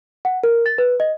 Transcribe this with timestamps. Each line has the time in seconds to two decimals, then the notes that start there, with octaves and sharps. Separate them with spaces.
0.25 F#5
0.44 A#4
0.66 A6
0.78 B4
1.00 D#5